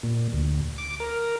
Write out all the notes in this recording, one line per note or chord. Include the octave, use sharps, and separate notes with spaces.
A#2
D2
D6
A#4